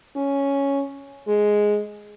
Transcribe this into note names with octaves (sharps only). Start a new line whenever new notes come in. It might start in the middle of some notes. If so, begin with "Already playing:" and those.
C#4
G#3